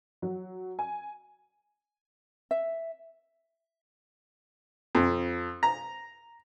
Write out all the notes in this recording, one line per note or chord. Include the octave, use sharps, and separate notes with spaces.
F#3
G#5
E5
F2
A#5